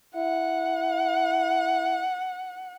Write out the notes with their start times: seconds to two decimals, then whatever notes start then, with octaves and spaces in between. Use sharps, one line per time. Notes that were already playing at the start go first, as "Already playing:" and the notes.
0.16 E4 F#5